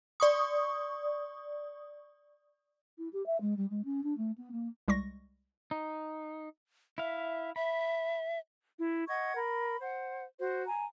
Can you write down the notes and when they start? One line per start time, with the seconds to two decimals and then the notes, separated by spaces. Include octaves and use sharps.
0.20 D5 C#6 D#6
2.98 E4
3.13 G4
3.26 E5
3.41 G#3
3.57 G3
3.70 G#3
3.85 C#4
4.03 D4
4.17 A3
4.38 B3
4.52 A#3
4.88 C2 G3 G#3 C#6 A#6
5.71 D#4
6.98 E4 E5 F5
7.56 E5 B5
8.79 E4
9.08 D#5 F#5 C#6 G#6
9.36 A#4 B5
9.81 C5 F#5
10.39 F#4 C5
10.67 G#5 A#5